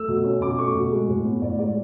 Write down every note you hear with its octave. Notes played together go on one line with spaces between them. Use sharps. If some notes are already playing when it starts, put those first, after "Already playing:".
Already playing: A3 E6
B2
C#4
B2 D6
A3 C#6
B2
G#3
A2
B3
A2 D5
G#3 D5